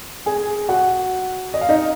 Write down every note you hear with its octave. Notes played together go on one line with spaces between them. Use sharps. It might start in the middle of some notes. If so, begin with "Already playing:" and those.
G#4 G#5
F#4 F#5
D#5
F5
D#4 D#5